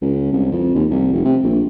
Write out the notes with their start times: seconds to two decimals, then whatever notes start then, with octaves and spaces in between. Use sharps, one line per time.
0.02 C#2
0.32 C2
0.52 F2
0.75 D#2
0.90 C2
1.13 F1
1.25 C3
1.43 A#1